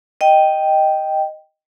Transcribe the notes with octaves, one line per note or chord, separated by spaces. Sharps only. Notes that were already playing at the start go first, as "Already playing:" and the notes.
D#5 G5